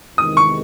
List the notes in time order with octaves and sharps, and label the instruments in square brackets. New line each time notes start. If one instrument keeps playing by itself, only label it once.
[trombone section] E2 C3 D#3 G#3 C4 [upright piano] D#6
[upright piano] C#6